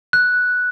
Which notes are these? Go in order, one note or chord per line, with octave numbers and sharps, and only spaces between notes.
F#6